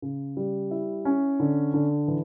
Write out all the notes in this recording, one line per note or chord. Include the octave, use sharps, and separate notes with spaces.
C#3
G3
E4
C#4
D3
D3
E3